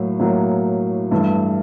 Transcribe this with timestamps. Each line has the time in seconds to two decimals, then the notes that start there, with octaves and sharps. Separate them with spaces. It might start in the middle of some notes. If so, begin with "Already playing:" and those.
Already playing: A2 F#3 A#3
0.20 A2 F#3 A#3
1.11 G2 E3 A3